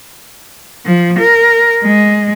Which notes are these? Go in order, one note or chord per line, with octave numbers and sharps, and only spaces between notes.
F3
A#4
G#3